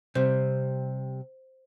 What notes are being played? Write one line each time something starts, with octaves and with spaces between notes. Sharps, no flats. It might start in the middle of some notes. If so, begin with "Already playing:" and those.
C3 G3 C5